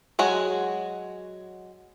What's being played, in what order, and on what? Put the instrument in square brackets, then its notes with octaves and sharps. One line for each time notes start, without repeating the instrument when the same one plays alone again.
[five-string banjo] F#3 G#3 F#4 G#4